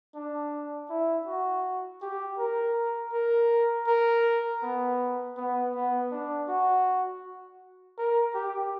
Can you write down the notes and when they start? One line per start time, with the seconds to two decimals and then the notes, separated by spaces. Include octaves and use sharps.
0.15 D4
0.90 E4
1.27 F#4
2.01 G4
2.38 A#4
3.13 A#4
3.87 A#4
4.63 B3
5.37 B3
5.75 B3
6.11 D4
6.48 F#4
7.98 A#4
8.34 G4